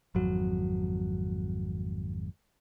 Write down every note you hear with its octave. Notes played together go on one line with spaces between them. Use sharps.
G#1 F2 F#3